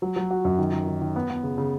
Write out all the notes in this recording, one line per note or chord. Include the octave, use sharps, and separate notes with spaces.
F#3
F#3
F#4
F#2
D#3
D#3
D#3
D#3
B3
B3
C#3
C#3